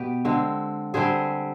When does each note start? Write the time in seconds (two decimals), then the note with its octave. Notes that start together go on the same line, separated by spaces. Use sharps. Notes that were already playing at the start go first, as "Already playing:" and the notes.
Already playing: B2 B3 G4 B4
0.25 D3 G#3 C4
0.94 D3 G3 C4 G#4 C5